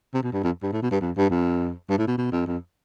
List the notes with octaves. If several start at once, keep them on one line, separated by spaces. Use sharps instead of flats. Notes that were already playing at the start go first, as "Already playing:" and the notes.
C3
B2
G2
F2
G2
A2
B2
G2
F2
G2
F2
G2
A2
B2
B2
F2
F2